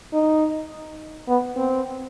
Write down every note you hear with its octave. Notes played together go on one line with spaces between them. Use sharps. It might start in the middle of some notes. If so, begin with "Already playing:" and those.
D#4
B3
C4